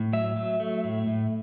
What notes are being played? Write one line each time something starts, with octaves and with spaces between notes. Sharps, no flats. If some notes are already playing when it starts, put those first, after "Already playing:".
Already playing: A2
F#3 E5
F#3
A3
A2
A2